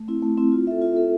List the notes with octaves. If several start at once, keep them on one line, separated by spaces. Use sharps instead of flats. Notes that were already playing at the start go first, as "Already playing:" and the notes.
Already playing: A3
C4 E4
A3
C4 E4
F4
A4 E5
F4
A4 E5